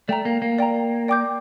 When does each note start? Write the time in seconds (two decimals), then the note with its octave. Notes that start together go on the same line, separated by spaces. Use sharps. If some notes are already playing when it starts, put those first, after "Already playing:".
0.08 A3 D5 G5 A#5
0.25 A#3
0.42 A#3
0.59 D5 G5 A#5
1.08 D5 G5 D6 G6